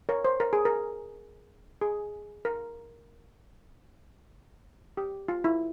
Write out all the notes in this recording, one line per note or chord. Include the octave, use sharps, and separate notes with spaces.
A#4 C#5
C5
A#4
G#4
A#4
G#4
A#4
G4
F4
E4